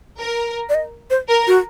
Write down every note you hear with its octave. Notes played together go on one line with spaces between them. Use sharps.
A#4
D5
D#5
C5
A#4
F#4